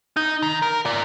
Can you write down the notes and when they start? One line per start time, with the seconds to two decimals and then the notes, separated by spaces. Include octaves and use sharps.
0.17 D#4
0.42 D#3
0.62 A#4
0.86 A#4 D5